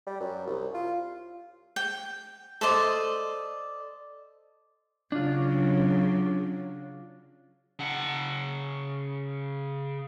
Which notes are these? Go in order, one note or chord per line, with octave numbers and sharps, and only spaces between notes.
G3
F#2
C2
F4
G5
A4 C5 D5 D#5
C#3 F#3 D4 F4
C#3 F#5